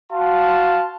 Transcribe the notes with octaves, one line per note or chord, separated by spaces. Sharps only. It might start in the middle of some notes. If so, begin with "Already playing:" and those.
F#4 F5 A5 C6